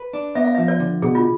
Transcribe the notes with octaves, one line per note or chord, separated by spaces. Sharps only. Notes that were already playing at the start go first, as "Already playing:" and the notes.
Already playing: B4
D4
B3 E5
F5
F3 E5
D5
D3
B2 G#4
F4